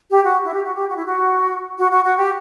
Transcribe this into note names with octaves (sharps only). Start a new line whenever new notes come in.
G4
F#4
E4
G4
F#4
G4
F#4
E4
F#4
F#4
F#4
F#4
G4